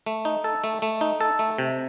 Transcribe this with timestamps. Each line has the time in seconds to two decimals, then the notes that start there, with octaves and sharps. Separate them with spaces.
0.06 A3
0.25 D#4
0.44 A4
0.64 A3
0.82 A3
1.01 D#4
1.21 A4
1.39 A3
1.58 C3